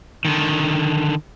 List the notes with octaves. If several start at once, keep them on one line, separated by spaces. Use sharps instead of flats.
D3 D#3